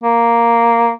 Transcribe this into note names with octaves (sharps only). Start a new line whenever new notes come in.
A#3